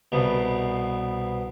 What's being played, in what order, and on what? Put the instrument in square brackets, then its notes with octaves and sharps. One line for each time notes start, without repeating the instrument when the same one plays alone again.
[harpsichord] C2 B2